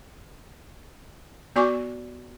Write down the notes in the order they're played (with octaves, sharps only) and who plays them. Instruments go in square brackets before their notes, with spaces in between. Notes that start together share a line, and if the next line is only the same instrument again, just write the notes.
[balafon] B3 F#4 D5 G#5 C#6 D6